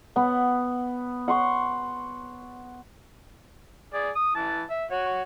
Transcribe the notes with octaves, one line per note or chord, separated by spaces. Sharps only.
B3 F#5
F#5 C6 C#6
G#4 D5
D#6
E3 A5
E5
F#4 C#5